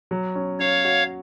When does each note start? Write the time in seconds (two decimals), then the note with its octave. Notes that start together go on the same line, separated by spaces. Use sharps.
0.11 F#3
0.35 C#4
0.59 C#4 C#5 F5
0.84 F#4